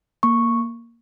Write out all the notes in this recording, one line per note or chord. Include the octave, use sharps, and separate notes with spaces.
A#3 C#6